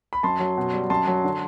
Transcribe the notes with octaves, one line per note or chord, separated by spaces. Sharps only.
B5
F#2 A5 C6
F#3
B2
G3
F#2 A5 C6
F#3
D3